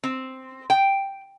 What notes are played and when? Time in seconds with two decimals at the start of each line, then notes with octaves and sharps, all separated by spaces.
0.04 C4
0.70 G5